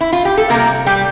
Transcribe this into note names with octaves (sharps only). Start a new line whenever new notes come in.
E4
F4
G4
A4
C3 G3 A#3 A#4
G3 G4